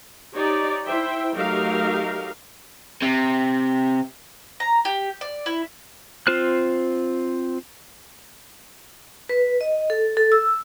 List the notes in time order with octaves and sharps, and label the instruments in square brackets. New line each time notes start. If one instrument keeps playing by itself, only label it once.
[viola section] D#4 G4 C#5 D5
E4 C5 E5 G5
F#3 A3 D#4 G4 A#4 F5
[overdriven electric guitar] C3
[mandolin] A#5
G4
D5
E4
[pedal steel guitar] C4 F4 C5 F6 F#6
[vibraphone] B4
D#5
A4
A4
E6